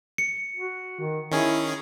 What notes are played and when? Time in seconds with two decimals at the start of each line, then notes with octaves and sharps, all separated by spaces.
0.18 C#7
0.57 F#4
1.00 D#3
1.32 D#3 C#4 E4 G#4